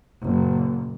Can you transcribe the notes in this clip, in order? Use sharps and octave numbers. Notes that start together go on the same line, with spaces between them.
F#1 A#2